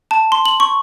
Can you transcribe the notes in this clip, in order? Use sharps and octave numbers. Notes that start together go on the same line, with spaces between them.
A5
C6
F#7
C#6